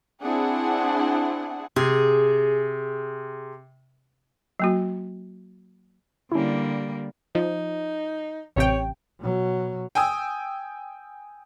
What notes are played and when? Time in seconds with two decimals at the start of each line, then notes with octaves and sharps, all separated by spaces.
0.21 C4 D4 E4 G#4 F#5
1.76 C3 G#4
4.60 F#3 A#3 F#4
6.32 D3 G3 A#3 C#4 E4
7.35 F3 D#4
8.56 A1 C3 C#5 G5
9.19 B2 F#3
9.95 G5 G#5 D#6 E6